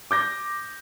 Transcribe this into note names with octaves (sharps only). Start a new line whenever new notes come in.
D6 G6 A#6